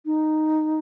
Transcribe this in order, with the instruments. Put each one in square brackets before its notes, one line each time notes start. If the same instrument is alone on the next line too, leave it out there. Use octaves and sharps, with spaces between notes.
[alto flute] D#4